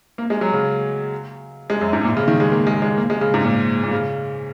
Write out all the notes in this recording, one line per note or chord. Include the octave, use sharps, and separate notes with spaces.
A#3
G#3
F#3
C#3
G#3
F#2
G#2
A#2
C#3
D#3
G#3
A#3
G#3
G#3
A#3
G#3
C#3
G#2
A#2
A#2
C#3